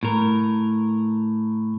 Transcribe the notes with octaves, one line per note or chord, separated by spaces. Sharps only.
A2 A#4